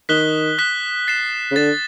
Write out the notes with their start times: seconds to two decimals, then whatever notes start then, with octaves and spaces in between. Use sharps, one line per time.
0.09 D#3 D#6 F#6 B6 E7 G7
0.58 D#6 F#6 B6 E7 G7
1.08 A6 C7 E7
1.51 C#3
1.56 D3 A6 C7 E7